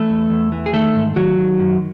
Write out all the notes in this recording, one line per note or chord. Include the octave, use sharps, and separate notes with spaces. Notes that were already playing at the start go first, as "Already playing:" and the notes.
Already playing: E3 A3 A4
E2
E2
E3
G#4
D#3 A3 A4
G#2
D#3 F#3 F#4
D#3
F#2